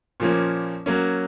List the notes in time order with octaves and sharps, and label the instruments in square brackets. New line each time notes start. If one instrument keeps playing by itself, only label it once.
[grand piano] A#2 F3 A#3 C#4
F#3 A#3 C#4